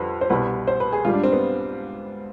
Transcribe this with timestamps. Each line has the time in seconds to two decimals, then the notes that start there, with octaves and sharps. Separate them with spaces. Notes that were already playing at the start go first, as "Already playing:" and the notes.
Already playing: F2 D3 G3 B4
0.21 C5
0.30 C2 B2 G3 B4
0.68 C5
0.80 B4
0.93 G#4
1.05 G#2 G3 F4
1.14 D4
1.23 C4
1.32 B3